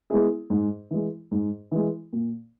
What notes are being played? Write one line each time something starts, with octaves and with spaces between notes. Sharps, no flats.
G#3 B3 E4 G#4
G#2
E3 G#3
G#2
E3 G#3
A#2